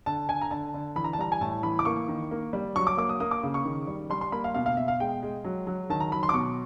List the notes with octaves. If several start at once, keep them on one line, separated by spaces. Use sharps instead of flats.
D3 A5
D3 G#5
A#5
D3 A5
D3
E3 B5
A#5
A5
G3 A#5
G#5
A2 A5
E3 B5
D6
A#3 C#6
D#3
A#3
G3
F#3 C#6
D6
A#3 D6
D#6
A#3 D#6
D6
C#3
C#6
D#3
G3
G3 C6
C6
A#3 B5
F5
B2 F5
F5
B2 E5
F5
G#3 G5
G#3
F#3
F#3
D#3 A5
A#5
F#3 B5
C6
D6
B2 C#6